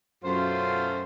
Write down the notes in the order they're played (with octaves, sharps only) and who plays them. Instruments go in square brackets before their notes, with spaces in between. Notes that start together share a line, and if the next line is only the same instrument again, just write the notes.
[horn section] F#2 [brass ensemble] B2 C#4 F4 [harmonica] A3 C5